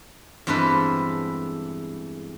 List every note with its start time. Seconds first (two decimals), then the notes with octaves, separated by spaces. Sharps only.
0.47 E2 G2 G#3 C4 A4 B4